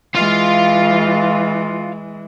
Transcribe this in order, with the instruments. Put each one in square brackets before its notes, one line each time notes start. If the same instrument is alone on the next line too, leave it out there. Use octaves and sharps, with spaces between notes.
[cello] E3 G#3 [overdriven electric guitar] F4 F5